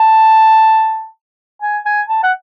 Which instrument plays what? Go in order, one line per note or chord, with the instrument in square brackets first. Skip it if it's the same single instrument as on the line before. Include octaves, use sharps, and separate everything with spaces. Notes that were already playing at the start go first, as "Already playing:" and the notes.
Already playing: [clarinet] A5
G#5
G#5
A5
F#5